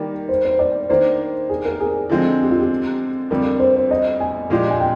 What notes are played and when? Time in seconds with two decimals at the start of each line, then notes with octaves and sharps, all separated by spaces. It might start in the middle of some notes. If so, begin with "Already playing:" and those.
Already playing: D#3 G3 A#3 A#4
0.29 C5
0.45 C5
0.59 D5
0.89 D#3 A#3 D4 C5
1.49 G#4
1.65 A#4
1.80 G#4
2.09 D3 F3 G#3 C4
2.42 G4
2.50 F4
2.60 G4
3.30 F2 D3 G3 A#4
3.60 C5
3.76 C5
3.91 D#5
4.20 G#5
4.50 A#2 F3 G#3 D4 G4
4.70 G#5
4.80 G5